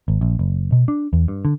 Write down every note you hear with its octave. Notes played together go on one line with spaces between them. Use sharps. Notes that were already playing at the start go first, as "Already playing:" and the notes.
G#1
A#1
F#1
B2
D4
E2
G2
D3